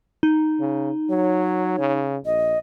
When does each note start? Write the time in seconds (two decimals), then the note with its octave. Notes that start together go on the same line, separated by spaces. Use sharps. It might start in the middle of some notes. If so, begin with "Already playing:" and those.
0.23 D#4
0.59 C#3
1.09 F#3 C#5
1.79 C#3
2.25 A#1 D#5